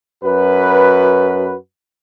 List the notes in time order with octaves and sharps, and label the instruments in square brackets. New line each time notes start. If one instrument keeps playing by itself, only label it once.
[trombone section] F#2 F#4 B4